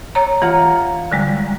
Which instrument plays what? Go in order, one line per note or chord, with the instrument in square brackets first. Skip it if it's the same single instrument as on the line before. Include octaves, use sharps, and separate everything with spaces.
[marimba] C#5 A#5
[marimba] E3 [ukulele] F4 F#5 A#5
[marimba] D3 G3 G#3